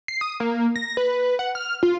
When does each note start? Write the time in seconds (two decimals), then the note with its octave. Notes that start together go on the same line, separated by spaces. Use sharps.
0.08 C7
0.21 D#6
0.40 A#3
0.76 A#6
0.97 B4
1.39 F#5
1.55 F6
1.83 F4